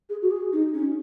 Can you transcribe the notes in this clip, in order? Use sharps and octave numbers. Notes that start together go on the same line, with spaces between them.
G#4
F#4
G#4
D#4
C#4